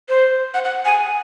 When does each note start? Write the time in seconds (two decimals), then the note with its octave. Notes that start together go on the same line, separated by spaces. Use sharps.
0.09 C5
0.54 F#5
0.65 F#5
0.85 G#5